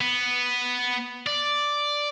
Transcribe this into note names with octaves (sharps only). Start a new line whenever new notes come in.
B3
D5